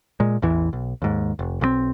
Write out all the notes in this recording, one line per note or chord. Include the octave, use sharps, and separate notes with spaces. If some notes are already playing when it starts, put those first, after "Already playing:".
A#2 G#3
A1 E2 E3
B1
D#2 G#2
F1
B1 F3 C4